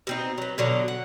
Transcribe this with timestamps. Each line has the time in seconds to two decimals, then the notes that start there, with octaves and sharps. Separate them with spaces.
0.07 B2 C4 D#4
0.38 F#3 B3
0.58 B2 D3 F#3
0.88 F#5